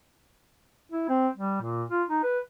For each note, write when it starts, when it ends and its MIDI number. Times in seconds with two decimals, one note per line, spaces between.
0.92 1.06 64
1.09 1.28 60
1.37 1.60 55
1.62 1.85 46
1.90 2.03 65
2.10 2.22 63
2.23 2.39 71